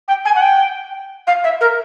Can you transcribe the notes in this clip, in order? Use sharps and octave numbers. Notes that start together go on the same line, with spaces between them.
G5
G#5
F#5
G5
F5
E5
A#4